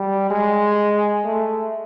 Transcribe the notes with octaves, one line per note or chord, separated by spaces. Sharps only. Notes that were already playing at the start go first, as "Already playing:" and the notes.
Already playing: G3
G#3
A3